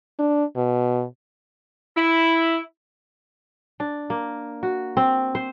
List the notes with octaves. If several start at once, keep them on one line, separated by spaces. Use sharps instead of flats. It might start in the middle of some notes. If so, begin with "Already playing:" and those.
D4
B2
E4
D4
A#3
F#4
C4
C5